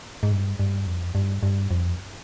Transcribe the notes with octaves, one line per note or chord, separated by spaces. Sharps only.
G#2
G2
G2
F2
G2
G2
F2